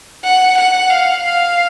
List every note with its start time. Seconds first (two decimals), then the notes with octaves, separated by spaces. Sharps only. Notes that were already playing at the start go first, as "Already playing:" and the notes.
0.24 F#5
0.57 F#5
0.90 F5
1.23 F5